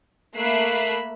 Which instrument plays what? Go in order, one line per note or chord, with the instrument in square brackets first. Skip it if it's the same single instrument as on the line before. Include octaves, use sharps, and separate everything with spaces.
[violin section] A3 A#3 E5 B5 F#6 C7